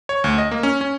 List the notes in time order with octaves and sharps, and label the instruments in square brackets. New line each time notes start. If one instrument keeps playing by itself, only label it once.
[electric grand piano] C#5
D2
D#5
A#3
C#4
C#4